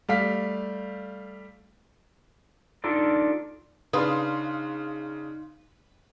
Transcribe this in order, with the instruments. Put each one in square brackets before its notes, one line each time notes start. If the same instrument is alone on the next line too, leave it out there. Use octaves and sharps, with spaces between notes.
[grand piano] G3 A3 F5 B6
[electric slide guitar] D4 D#4 F4 A4 D5
[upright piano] C#3 D4 [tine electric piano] D#4 [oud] B4 [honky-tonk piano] F5 C6 D#6